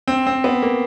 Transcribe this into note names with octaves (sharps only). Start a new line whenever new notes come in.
C4
C4
B3
A#3